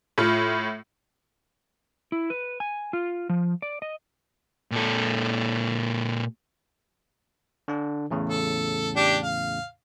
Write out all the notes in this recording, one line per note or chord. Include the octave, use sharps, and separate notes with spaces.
A2 F4
E4
B4
G#5
F4
F3
D5
D#5
A#2 A4
D3 D4
E2 A2 C#3
A4
D4 G4
F5